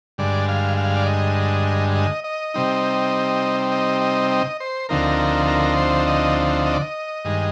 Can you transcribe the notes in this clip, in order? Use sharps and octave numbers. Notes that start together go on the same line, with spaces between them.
G2 D3 G#3 D5
F5
F5
D5
D#5
D#5
D#5
C3 G3 C4 D#4
D#5
D#5
D#5
C5
D2 D3 F3 C4 D#4 A#4
A#4
C5
D#5
D#5
D5
D#5
G2 D#3 G#3